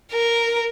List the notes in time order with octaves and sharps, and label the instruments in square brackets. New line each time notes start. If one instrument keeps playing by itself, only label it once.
[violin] A#4